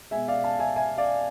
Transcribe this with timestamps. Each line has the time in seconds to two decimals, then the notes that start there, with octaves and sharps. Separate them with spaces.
0.11 B2 G#3 E5 G#5
0.28 D5 F5
0.44 F5 A5
0.59 E5 G#5
0.76 E5 G#5
0.97 D5 F5